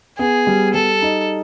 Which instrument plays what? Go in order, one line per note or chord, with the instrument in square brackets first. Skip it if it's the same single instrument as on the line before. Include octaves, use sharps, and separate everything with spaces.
[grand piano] B3 [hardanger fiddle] G#4
[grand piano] G3
[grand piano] G3 [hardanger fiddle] A4
[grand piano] D#4